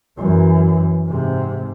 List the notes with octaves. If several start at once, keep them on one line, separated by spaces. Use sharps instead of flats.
F#2 E3
G#2 C3